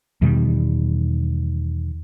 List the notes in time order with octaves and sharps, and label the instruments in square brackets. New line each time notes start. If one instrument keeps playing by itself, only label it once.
[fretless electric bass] E2 B2 D#3 G3